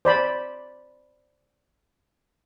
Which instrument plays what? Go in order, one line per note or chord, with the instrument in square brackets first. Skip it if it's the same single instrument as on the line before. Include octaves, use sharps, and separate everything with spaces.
[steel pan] C5 D5 B5